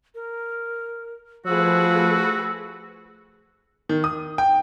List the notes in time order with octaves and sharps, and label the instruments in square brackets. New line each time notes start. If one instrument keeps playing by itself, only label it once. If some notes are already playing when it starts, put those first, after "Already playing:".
[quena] A#4
[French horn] F3 [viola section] A3 G#4 B4 [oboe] F#4 [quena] E6
[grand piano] D#3
D#6
G5